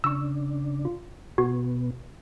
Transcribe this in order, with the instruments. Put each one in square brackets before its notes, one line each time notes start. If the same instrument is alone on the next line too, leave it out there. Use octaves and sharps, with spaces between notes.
[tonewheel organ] C#3 D4 [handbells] C#6 E6
[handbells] F4
[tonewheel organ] B2 B3 [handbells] F#4